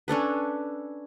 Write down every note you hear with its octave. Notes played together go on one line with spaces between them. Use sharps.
C#4 D4 A4 B4